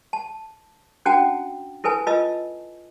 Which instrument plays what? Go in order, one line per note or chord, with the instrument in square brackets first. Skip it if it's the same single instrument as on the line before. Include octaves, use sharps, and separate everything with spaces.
[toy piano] A5
C#4 D4 F#4 F#5 G5 A5
E4 A4 B4 G#5 A5
F4 B4 D#5 A5 E6